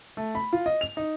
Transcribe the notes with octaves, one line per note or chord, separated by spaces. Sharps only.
A3
B5
F4
D#5
F7
D#4